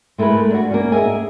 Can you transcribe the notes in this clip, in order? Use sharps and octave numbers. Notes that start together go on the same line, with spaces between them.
G#3 A3 E4 A#4 B4
D4 F#4
A#3 C#4
G#4 D#5 E5 G#5